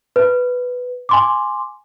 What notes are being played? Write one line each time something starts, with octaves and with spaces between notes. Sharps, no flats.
B4
G#5 C6 D6